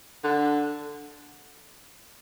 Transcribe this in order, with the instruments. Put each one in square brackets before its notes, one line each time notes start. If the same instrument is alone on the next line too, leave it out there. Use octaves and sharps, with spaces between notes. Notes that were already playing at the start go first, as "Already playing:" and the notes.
[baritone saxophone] D3